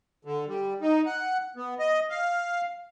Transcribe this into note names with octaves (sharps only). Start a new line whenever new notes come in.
D3
G3
D#4
F#5
B3
D#5
F5